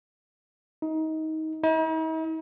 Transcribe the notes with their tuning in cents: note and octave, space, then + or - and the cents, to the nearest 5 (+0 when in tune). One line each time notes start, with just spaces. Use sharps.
D#4 +20
D#4 +45